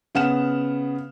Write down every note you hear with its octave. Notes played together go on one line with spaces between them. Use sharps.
C#3 B3 F#5 F6 E7